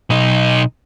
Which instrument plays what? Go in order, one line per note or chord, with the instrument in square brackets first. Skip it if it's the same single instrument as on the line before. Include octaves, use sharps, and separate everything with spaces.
[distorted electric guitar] B1 D#4